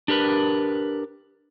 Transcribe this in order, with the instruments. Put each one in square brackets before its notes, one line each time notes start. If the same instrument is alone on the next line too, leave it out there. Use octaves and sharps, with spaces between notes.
[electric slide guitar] D4 G4 A#4 B4